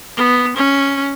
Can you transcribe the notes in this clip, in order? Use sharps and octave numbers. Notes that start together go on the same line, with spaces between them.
B3
C#4